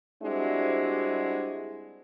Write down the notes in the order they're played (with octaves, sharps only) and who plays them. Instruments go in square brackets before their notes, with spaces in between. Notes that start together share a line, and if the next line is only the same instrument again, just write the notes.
[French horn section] G3 G#3 C4 D4 E4 F#4